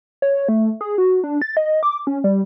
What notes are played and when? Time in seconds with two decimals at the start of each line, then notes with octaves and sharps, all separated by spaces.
0.22 C#5
0.49 A3
0.81 G#4
0.98 F#4
1.24 D4
1.42 A6
1.57 D#5
1.83 D6
2.07 C#4
2.24 G3